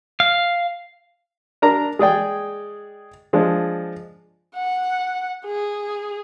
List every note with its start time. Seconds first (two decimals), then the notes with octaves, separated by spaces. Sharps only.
0.20 F5
1.62 D4 A#4 A#5
1.99 G#3 G#4 D5 G5
3.33 F3 G#3 D4
4.56 F#5
5.45 G#4